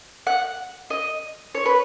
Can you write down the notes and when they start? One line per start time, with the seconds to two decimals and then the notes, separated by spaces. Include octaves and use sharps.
0.27 F#5
0.90 D#5
1.55 C#5
1.66 B4